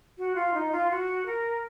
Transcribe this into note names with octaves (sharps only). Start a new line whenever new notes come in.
F#4
F4
D#4
F4
F#4
A#4